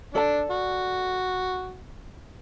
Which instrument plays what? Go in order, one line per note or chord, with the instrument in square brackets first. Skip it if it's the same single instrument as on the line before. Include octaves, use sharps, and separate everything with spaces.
[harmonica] D4 [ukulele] A4 D5 A5
[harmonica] F#4